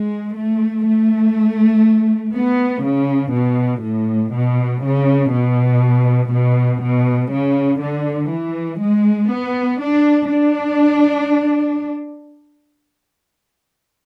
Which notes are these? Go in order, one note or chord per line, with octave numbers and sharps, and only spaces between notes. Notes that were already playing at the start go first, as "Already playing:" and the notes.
Already playing: G#3
A3
A3
B3
C#3
B2
A2
B2
C#3
B2
B2
B2
C#3
D3
E3
G#3
B3
D4
D4